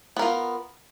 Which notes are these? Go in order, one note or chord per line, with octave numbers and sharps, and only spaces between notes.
B3 F4 A#4